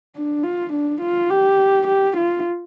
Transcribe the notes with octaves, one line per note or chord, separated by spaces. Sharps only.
D4
F4
D4
F4
G4
G4
F4